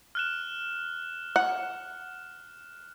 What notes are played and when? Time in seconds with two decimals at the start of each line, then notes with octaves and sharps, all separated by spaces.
0.15 F6 F#6 E7
1.36 F#5